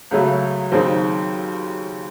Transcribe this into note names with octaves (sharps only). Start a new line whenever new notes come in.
C#2 C#3 F#3 A3
D#2 C#3 F#3 C4 D#4